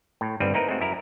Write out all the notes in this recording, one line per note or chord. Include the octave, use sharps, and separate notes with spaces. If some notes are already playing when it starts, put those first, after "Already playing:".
A2
G1 G2 D#3 G3 C4 B4
A#3 C4 D#4 E4 A#4 B4
G#3 A3 C4 F#4
F#2 E4 A#4